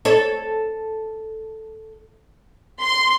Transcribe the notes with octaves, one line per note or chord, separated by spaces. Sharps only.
A4 C#5
C6